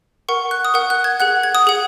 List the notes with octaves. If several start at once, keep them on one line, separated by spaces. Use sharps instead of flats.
A#4 F#5 C#6
F#6
D#6
A#4 F#5 F#6
F#6
G#6
G#4 F#5 F#6
G#6
D#6
G#4 F#5